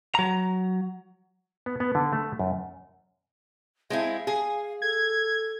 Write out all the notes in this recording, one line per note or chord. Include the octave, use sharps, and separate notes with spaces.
F#3 A#5
B3
B3
D3
A3
F#2
G#3 C4 E4 F5
G#4
A4 G#6